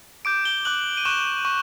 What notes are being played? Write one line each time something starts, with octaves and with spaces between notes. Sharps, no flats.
D6 G6 D7
G7
D6 F#6 F#7
D#7
C#6 F#6 E7
C#6